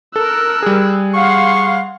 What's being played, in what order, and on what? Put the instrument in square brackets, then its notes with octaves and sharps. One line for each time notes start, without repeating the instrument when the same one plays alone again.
[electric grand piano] A4 [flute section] A#4 [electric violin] E6 F#6
[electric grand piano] G3 G#4
[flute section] F5 [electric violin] F#5 C6 [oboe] C#6